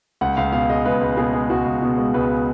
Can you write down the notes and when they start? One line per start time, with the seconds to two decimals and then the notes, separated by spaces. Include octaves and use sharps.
0.21 C#2 F#5
0.37 C#2 F5
0.52 B2 F5
0.70 G#3 D#5
0.85 C#2 B4
1.01 C#2
1.17 B2 G#4
1.33 G#3
1.50 C#2 F#4
1.65 C#2
1.82 B2
1.98 G#3
2.14 C#2 B4